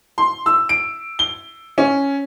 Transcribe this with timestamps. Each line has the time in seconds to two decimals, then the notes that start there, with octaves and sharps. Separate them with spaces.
0.18 C6
0.46 E6
0.69 D7
1.19 G7
1.78 C#4